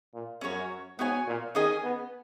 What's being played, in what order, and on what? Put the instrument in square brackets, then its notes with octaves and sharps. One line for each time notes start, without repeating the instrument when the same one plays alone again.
[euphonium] A#2
[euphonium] F#2 [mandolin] C#4 F#4 C#5
[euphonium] G#2 [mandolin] B3 F#4 C#5 G#5
[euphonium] A#2
[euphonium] D#3 [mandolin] C#4 G#4 D#5 G#5
[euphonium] B3